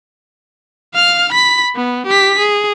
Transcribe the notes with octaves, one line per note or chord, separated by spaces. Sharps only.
F5 F6
B5 B6
B3
G4 B6
G#4